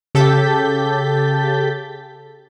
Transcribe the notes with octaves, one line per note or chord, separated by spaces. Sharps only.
C#3 G4 A4 G6 A6 B6